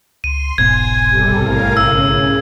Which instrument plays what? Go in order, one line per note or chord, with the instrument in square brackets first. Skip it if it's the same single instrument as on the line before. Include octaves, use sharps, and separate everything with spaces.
[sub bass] C#2 [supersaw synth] C6 [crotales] D#7
[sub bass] F1 [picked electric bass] B1 G#2 B2 [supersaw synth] G#5 [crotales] G#6
[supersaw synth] C3 G3 A4
[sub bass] A1 [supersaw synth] A2 A#4 F5
[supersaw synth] C#3 [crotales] E6